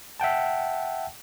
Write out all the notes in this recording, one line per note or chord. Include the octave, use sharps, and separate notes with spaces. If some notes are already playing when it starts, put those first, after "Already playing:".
E5 F#5 G5 A5